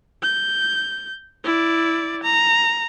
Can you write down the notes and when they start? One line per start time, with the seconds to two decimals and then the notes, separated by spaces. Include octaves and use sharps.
0.22 G6
1.44 E4 D5
2.23 A#5